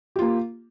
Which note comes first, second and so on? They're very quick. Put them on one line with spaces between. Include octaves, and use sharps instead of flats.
G4 F4 A#3